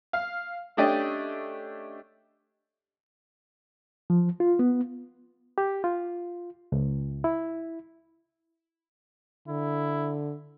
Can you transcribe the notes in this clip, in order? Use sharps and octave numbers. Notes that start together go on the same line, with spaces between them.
F5
A3 C#4 D4 G4 D#5 G5
F3
F4
B3
G4
F4
C#2
E4
D3 E4